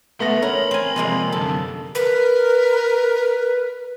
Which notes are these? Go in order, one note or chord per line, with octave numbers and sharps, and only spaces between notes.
A3 B3 B5 C6 A#6
C#4 A#4
C4 G#5
F2 C3 G#3 A#3
F#2 D3 A4
A#4 B4